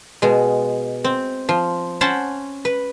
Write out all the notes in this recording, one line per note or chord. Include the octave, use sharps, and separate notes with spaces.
B2 G#3
C4
F3
C#4 C5 F#5 G5 A5 B5
B4